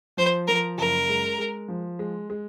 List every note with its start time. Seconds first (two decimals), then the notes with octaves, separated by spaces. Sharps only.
0.17 F3 C5
0.47 F3 A#4
0.77 F#1 A#4
1.09 G#3
1.38 G#3
1.68 F3
1.99 G#3
2.30 G#3